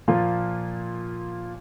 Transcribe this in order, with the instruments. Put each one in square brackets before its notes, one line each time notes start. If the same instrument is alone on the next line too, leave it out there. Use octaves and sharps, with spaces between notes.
[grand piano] A#2 F3 A#3 F4